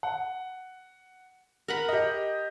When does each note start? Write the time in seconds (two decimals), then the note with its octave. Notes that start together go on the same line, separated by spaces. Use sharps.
0.03 F#5
1.68 A#4 F#5 B5
1.89 G4 D#5